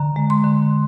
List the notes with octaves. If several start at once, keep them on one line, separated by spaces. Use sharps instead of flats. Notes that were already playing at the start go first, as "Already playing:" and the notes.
Already playing: D3 A#5
G#3
C6
D3